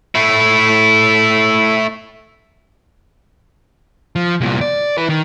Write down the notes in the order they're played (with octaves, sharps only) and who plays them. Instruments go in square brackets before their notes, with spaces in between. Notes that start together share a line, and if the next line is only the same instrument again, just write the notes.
[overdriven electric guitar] A3 E4
[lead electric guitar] F3
C2 A#2
D5
E4 B4
D#3